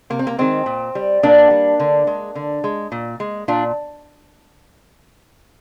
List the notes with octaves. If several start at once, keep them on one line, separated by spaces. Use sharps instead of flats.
C3 A#3
C4
A#3
D#3 G#3 C4
A#2
G3
A#2 A#3 D4
G3
D3
G#3
D3
G#3
A#2
G#3
A#2 D4 F4